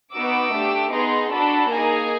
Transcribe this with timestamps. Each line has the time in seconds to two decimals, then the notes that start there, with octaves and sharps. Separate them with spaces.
0.14 B3 D#4 F#4 D6 E6
0.54 A3 D4 G4
0.92 B3 D#4 G#4 A#5 C6
1.32 D4 F#4 A4 A5 B5
1.71 A#3 D#4 G#4 G#5 A#5